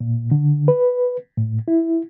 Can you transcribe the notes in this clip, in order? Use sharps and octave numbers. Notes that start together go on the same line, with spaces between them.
A#2
D3
B4
A2
E4